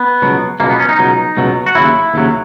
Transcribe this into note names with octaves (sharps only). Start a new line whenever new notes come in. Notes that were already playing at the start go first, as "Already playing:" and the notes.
Already playing: B3
C#2 B2 F#3
C#2 B2 F#3 A#3
B3
C#4
D#4
C#2 B2 F#3
C#2 B2 F#3
F#4
D#2 C#3 F#3 E4
D#2 C#3 F#3